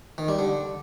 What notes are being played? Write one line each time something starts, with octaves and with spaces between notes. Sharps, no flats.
D#3
G3
D3